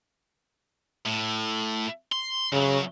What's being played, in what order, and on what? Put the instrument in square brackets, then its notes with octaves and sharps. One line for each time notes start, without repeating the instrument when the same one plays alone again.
[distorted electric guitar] A2
C6
[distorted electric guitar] F#2 F#3 [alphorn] C#3